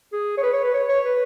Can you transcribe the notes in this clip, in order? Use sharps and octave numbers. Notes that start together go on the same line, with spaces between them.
G#4
C#5
B4
C#5
B4
C#5
C#5
B4